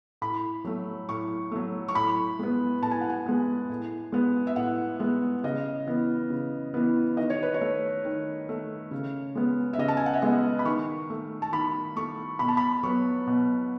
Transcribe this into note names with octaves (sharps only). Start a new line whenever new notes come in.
A2 B5
F#3 A3
A2 C#6
F#3 A3
C#6
A2 B5
G#3 B3
A2 A5
G#5
F#5
G#5
G#3 B3
A2
G#3 B3
E5
A2 F#5
G#3 B3
C#3 D#5
E3 B3
C#3
E3 B3
D#3 D#5
C#5
B4
C#5
A3
D#3
A3
C#3
G#3 B3
E5
C#3 D#5
A5
G#5
F#5
E5
G#3 B3 D#5
B5
D#3 C#6
A3
A5
D#3 B5
A3 C#6
B2 B5
A5
B5
F#3 B3 C#6
B2